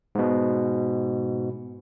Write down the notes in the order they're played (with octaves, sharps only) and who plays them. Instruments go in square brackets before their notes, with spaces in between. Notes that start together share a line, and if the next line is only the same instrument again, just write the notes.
[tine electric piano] G#2 B2